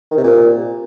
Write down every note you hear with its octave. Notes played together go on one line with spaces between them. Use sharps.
D#3
C3
A#2